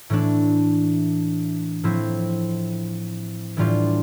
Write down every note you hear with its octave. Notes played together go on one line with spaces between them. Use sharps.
A2 E3 A3 D4
A2 F3 C4 E4
A2 E3 G3 D4 F4